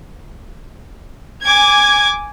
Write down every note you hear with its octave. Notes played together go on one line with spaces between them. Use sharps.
G#5 D6 G#6